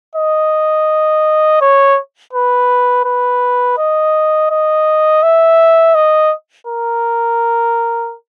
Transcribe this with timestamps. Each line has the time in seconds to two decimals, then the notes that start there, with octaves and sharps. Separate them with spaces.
0.16 D#5
1.61 C#5
2.33 B4
3.05 B4
3.78 D#5
4.51 D#5
5.23 E5
5.95 D#5
6.67 A#4